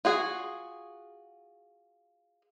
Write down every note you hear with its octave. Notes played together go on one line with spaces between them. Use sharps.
F4 F#4 G#4